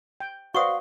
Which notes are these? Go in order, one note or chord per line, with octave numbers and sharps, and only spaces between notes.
G5
F#4 B4 C5 D5 F5 C6 C#6 D#6